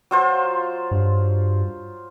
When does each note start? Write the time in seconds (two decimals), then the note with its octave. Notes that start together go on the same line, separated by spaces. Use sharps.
0.11 F#3 F4 C5
0.91 G2